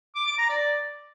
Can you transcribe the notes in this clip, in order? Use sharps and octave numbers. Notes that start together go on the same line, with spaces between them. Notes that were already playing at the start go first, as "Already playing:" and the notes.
D6
D6
A#5
D5